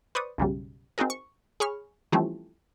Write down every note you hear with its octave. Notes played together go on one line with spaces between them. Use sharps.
B4 C5 D5 C#6 D#6
B1 F#2 C#3 G3
C4 D#4 F#4 G#4 A#4
C#6
G#4 C#5 B5 C#6 F6
E3 F3 G3 A3 C4 C#4